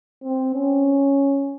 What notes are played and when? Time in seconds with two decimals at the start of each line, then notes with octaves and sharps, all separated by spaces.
0.24 C4
0.55 C#4